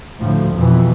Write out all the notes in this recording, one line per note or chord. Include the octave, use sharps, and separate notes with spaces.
D2 A2 F3
F2 B2 E3